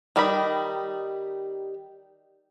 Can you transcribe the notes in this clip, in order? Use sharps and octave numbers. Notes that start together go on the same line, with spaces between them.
D#3 G3 D#4 B5